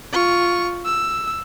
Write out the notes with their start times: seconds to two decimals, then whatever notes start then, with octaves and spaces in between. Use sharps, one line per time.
0.13 F4 C#6
0.85 E6